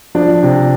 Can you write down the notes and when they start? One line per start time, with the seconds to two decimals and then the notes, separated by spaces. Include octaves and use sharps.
0.15 F3 D4
0.43 C3